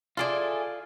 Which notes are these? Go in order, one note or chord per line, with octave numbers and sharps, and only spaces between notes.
E4 F4 G#4 A4 D5